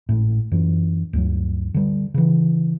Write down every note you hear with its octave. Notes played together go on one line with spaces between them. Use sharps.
G#1 A2
F#2 E3
D2 G2 F#3
D3 G3
C#3 E3